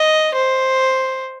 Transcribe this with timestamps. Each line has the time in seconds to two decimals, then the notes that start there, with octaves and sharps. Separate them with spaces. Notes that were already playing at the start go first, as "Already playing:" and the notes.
Already playing: D#5
0.35 C5